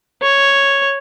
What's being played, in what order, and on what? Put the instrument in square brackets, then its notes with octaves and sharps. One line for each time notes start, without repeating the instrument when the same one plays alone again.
[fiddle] C#5